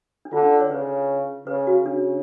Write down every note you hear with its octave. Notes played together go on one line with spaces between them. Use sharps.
D4
D3 F4
C#4
C#5
C#3 B4
C#3 B4
F#4
C#3 D4